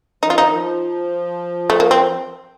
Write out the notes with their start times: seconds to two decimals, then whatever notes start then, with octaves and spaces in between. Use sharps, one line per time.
0.23 F3 D#4
0.30 F4
0.36 D#3 D#4
0.51 F3
1.70 A3
1.80 A#3
1.91 C4